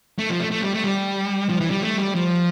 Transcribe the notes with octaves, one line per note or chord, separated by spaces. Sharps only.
A3
F3
A3
A3
G3
A3
G3
F3
E3
G3
A3
G3
F3